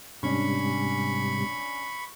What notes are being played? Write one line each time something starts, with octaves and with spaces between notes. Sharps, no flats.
G#2 C3 G3 C#4 D4 B5 C#6